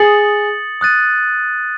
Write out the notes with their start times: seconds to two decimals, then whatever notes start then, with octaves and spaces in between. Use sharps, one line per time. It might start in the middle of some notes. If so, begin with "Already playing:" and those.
Already playing: G#4 D#6 A6 C#7 F#7
0.81 D#6 F#6 A6 D#7